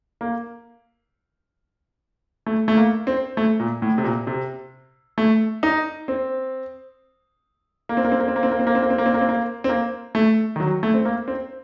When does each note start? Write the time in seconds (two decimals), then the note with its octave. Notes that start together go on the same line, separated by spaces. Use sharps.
0.21 A#3
2.46 A3
2.68 A3
2.77 A#3
3.07 C4
3.37 A3
3.60 A#2
3.82 A2
3.98 C3
4.04 A#2
4.27 C3
5.18 A3
5.63 D#4
6.08 C4
7.89 A#3
7.97 C4
8.05 A#3
8.12 C4
8.20 A#3
8.28 C4
8.36 A#3
8.43 C4
8.51 A#3
8.59 C4
8.67 A#3
8.75 C4
8.82 A#3
8.90 C4
8.98 A#3
9.06 C4
9.14 A#3
9.21 C4
9.29 A#3
9.64 C4
9.69 A#3
10.15 A3
10.56 D#3
10.60 F#3
10.83 A3
10.94 C4
11.05 A#3
11.28 C4